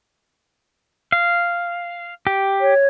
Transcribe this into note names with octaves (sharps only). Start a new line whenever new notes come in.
F5
G4
C#5